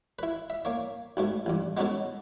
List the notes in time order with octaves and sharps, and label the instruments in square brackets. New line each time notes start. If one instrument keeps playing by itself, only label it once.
[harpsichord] E4 B4
E5
A#3 C#5
B1 G#2 A3
A1 G2
G#3 B3 C#4 D#4 F#4 A4